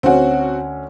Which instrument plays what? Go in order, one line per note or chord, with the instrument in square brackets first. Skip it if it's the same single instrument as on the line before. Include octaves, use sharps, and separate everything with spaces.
[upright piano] D2 C#4 [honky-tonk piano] C4 F#4